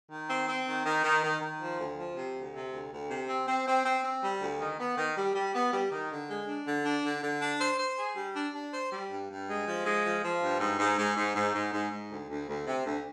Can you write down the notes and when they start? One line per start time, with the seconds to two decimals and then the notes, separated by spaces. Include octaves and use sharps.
0.11 D#3
0.29 C4
0.48 C4
0.67 D#3
0.86 D#3
1.04 D#3
1.23 D#3
1.41 D#3
1.60 F3
1.79 D2
1.98 F3
2.16 C3
2.35 D2
2.54 C3
2.73 D2
2.91 D2
3.10 C3
3.29 C4
3.48 C4
3.67 C4
3.85 C4
4.04 C4
4.23 G3
4.41 D2
4.60 D#3
4.79 B3
4.97 D#3
5.17 G3
5.35 G3
5.55 B3
5.72 G3
5.91 D#3
6.10 D3
6.30 G#3
6.47 D4
6.67 D3
6.85 D4
7.04 D3
7.23 D3
7.41 D4
7.61 C5
7.79 C5
7.98 G#4
8.16 G3
8.36 D4
8.54 D4
8.72 C5
8.92 G3
9.10 G2
9.30 G2
9.49 G#3
9.66 F3
9.86 G#3
10.05 F3
10.23 F3
10.42 G2
10.60 G#2
10.79 G#2
10.98 G#2
11.17 G#2
11.35 G#2
11.54 G#2
11.73 G#2
11.92 G#2
12.11 D2
12.29 D2
12.48 D2
12.67 C3
12.86 D2